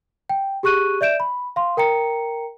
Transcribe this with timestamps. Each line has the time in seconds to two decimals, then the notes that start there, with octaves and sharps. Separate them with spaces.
0.30 G5
0.63 G4 G#4 C#6 F#6 D#7
1.01 D5 E5 G6 D7 E7
1.20 B5
1.56 F5 C6
1.77 A#4 G5 A#5 C#7